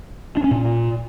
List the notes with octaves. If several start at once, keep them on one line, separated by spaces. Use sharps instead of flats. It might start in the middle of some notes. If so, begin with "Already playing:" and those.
D4
C#4
A#2